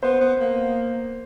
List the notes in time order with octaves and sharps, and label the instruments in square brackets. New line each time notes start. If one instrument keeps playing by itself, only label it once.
[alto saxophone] B3 [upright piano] C5
[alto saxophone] B3
A#3